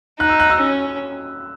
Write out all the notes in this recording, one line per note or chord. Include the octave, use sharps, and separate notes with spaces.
D#4 F#6
E6
F#6
E6
C#4